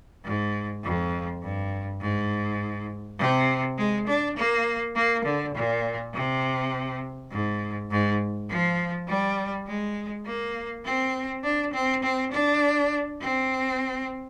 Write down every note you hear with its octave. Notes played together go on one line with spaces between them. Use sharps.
G#2
F2
G2
G#2
C3
G#3
D4
A#3
A#3
D3
A#2
C3
G#2
G#2
F3
G3
G#3
A#3
C4
D4
C4
C4
D4
C4